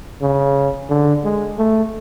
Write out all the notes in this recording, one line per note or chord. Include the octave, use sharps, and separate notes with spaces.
C#3
D3
G#3
A3